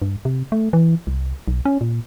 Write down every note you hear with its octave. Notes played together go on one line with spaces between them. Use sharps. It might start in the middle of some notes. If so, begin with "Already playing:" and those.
G2
C3
A3
E3
C2
B1
C#4
A#2